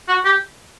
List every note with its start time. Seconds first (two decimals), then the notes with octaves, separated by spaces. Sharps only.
0.08 F#4
0.25 G4